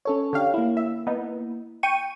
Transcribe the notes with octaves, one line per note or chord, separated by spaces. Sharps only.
C#4 A4 C#5
D3 G4 F5
A#3 E4
E5
B3 D#4
G5 C#6 D#7